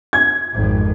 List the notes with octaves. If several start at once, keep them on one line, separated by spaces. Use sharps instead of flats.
G#6
G#1 F2